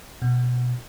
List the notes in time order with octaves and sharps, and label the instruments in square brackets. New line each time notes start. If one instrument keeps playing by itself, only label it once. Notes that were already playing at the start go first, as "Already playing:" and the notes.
[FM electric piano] B2